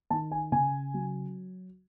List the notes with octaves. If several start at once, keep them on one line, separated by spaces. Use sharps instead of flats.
D#3 A5
G#5
C#3 G#5
F#3